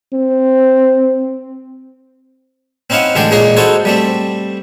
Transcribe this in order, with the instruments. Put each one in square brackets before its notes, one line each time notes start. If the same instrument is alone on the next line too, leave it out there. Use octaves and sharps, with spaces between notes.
[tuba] C4
[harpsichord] C4 C#4 D#4 E4 F5 F#5
A1 D3 G#3 D4 G#4 G5
A#2 G#3 A#3 C#4 G#4 A#4
D#4 E4 F#4 A4 C5 C#5
G3 A3 C4